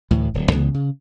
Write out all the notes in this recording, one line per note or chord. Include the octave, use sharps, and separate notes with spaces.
D2 A2 E3
D1
C#2 C#3 E3 B3
C#3